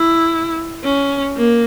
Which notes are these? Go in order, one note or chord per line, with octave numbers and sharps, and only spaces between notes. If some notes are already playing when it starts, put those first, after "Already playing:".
Already playing: E4
C#4
A#3